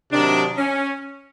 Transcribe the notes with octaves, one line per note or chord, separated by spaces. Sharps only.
C3 D#3 F#3 D4
C#4